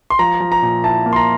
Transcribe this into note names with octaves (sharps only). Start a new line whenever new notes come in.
C6
F3 A#5
F3
A#5
A#2
E4 A5
A#3
C6
A#5